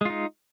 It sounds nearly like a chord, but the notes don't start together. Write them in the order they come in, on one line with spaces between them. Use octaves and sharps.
G#3 F4 D#4